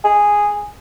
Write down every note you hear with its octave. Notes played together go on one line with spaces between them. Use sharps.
G#4